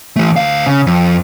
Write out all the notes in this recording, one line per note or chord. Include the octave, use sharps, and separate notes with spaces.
E3 A3
D2 F5
C#3
F2